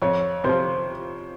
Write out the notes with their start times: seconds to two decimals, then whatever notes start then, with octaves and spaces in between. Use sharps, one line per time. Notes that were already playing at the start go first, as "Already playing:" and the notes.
0.02 F2 C#5
0.44 C3 F3 C5